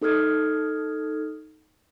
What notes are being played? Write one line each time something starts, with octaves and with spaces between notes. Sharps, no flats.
D#4 A4 D#6 F6 G#6